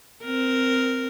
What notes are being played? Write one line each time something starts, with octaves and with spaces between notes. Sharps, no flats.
C4 A#4